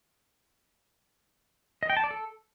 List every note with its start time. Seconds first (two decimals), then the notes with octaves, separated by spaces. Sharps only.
1.83 D#5
1.90 G5
1.97 A5
2.04 D5
2.11 A4